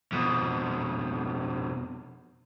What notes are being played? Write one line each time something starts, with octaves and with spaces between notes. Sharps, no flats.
F2 B2